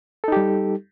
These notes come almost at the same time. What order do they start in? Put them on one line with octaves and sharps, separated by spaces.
A4 D#4 G4 G3